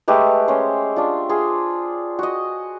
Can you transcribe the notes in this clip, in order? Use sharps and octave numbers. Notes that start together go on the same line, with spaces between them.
G#3 A3 G4 B4
C#4 C5
D4 F4
F4 G#4 C6
F#4 D#5